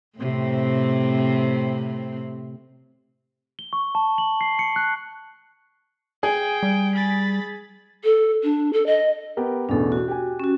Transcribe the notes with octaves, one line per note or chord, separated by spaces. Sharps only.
A2 C3 C4
G7
C#6
A5
F#7
C7
C#7
F#6
G#4 G5
G3
B5 A6
A4
D4
A4
D#5
B3 G4 A#4
A1 E2 B2 D4 A4
F#4
G4 G#5
C#4 F#4